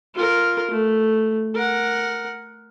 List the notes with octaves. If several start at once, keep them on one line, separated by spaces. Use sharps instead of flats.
F4 A#4
A3
A#4 F#5